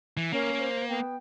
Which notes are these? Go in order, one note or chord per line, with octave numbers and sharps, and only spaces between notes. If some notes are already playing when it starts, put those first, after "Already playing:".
E3
A#3 C#4 A#4
C5
B3 G5